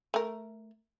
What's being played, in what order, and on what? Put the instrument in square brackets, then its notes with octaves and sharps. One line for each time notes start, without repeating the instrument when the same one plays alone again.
[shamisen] A3 A#4